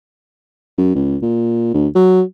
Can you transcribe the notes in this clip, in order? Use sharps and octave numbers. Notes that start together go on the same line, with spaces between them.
F#2
C#2
A#2
D2
F#3